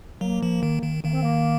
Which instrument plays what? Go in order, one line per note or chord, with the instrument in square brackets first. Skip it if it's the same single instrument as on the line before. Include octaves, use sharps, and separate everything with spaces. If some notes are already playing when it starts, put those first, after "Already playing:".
[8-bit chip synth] F#3 [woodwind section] A#3
[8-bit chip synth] F3
D#3
D#3
[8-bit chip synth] D#3 [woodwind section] A#3
[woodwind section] C4
A#3